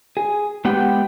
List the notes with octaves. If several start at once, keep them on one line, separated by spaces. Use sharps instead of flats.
G#4
G#3 B3 G4 B4 F#5 G5